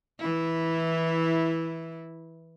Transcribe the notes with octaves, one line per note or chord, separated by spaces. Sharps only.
E3 E4